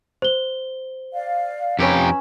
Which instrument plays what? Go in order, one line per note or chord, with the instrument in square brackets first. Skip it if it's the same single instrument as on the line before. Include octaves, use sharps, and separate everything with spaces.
[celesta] C5 G7
[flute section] D5 F5
[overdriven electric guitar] F2 G4 [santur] C#4 B4 E6 [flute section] F4 A#5